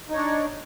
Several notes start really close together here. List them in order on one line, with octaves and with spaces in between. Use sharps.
D#4 C#5 D4